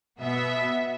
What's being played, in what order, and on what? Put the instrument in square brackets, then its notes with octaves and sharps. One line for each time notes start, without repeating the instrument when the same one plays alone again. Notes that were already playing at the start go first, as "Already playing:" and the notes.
[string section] B2 B3 E5